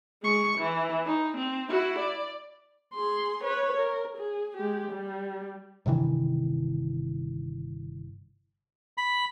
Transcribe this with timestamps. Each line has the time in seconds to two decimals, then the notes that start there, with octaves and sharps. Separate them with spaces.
0.23 G#3 C#6
0.58 E3
1.06 D#4
1.38 C4
1.69 E4 F#4
1.99 D5
2.94 G#4 C6
3.44 B4 C#5
3.77 A#4
4.18 G#4
4.57 G#3 G4
4.91 G3
5.86 G1 C3 D#3 E3
8.98 B5